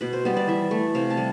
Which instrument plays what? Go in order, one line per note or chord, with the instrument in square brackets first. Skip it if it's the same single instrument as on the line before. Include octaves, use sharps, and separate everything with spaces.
[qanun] B2 B4
C5
G3 B3 C5
D5
E3 E5
A3
C3 F5
A5
G3